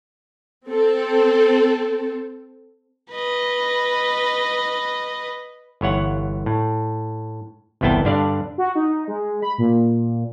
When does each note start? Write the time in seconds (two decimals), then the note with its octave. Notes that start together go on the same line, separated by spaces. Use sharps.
0.67 C4 A4
3.12 B4 D#5
5.81 G1 E3 C#5 F#5
6.46 A2
7.81 G1 C2 E3 B3 G5 A5
8.05 G2 D3 D4 D5 F5
8.58 F#4
8.75 D#4
9.08 G#3
9.42 B5
9.58 A#2